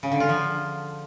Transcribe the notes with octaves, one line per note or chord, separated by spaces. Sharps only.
C#3
D3
F4
F3